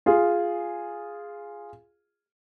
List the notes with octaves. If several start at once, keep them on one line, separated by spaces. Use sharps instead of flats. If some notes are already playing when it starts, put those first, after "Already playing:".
F4 G#4